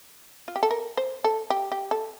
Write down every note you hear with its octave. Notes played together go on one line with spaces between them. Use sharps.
F4
G4
A4
A#4
C5
A4
G4
G4
A4